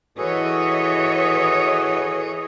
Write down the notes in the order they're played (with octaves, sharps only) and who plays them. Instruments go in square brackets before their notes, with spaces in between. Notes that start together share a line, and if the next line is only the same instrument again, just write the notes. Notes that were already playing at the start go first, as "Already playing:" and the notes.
[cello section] E3 C#5 D#5 [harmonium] F#4 A4 B4 [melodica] G#4